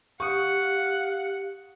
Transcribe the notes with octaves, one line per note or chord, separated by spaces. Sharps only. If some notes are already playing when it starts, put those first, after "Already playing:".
G4 F5 F#5 C#6 D#6